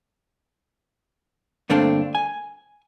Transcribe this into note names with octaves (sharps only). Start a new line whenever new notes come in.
G2 D3 A3 A#3 C4 D4
G#5